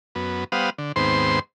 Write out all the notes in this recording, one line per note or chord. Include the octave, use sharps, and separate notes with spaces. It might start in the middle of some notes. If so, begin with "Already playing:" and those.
F#2 B3
G3 B3 C5 F5 F#5 D#6
D3
D#2 G#2 B3 C4 C5 C6